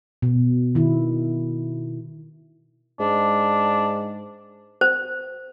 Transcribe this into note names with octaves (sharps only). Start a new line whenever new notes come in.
B2
D#3 E4
G#2 D4
C5